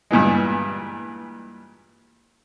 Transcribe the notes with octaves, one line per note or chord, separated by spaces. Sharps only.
G2 A#2 E3 G#3